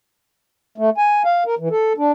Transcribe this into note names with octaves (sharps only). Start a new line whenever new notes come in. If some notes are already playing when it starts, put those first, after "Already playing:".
A3
G#5
F5
A#4
E3
A4
D4